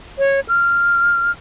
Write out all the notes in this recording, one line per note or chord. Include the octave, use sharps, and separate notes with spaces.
C#5
F6